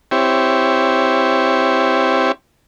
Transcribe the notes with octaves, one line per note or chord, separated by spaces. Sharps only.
C4 E4 G4 C#5